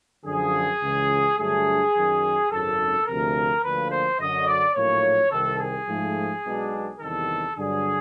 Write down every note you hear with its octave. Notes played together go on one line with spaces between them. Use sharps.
F#2 D3 F3 G#4
C#2 C#3 E3
G2 D3 F#3 A3 D4 G#4
F#2 D#3 F#3
G#1 F#2 C#3 A4
D2 C3 F3 A#4
D2 D3 F3 A#3 B4
C5
F#2 D3 F#3 D#5
D5
A#1 A2 F#3 A#3 C#5
C2 C3 D#3 A4
G#4
G#2 F3 A3
B1 B2 G#3 B3 D4
E2 C3 D#3 G3 A4
G2 D3 F#3 G#4